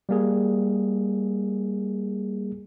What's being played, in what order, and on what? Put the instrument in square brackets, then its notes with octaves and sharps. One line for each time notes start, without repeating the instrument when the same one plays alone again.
[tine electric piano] G3 A#3 G#4